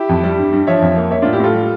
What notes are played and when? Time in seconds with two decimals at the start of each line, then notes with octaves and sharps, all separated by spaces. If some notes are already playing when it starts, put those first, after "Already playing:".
Already playing: E4 G4
0.09 F2
0.24 G3
0.38 G2
0.52 G2
0.67 F3 C#5 E5
0.82 F2
0.97 A#3
1.11 A#3 C#5 E5
1.22 A2 D4 F4
1.33 E4 G4
1.40 A2 F4 A4
1.54 G3